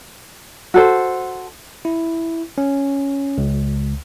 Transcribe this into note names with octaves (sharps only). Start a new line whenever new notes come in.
F#4 A4 C5
E4
C#4
C#2